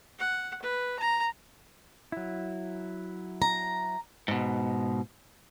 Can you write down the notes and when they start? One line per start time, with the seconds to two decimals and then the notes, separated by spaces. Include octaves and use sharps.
0.19 F#5
0.62 B4
0.99 A#5
2.12 F#3 E4
3.42 A#5
4.28 G#2 B2